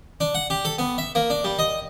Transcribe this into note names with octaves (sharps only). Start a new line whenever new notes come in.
D4
F#5
G4
A4
B3
E5
A#3
D4
G3
D#5